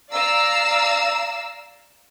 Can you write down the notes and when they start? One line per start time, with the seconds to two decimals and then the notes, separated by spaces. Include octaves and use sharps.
0.11 D5 F5 A#5 E6